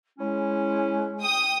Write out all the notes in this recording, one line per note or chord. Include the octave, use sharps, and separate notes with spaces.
G#3 C#4 E4
G5 D#6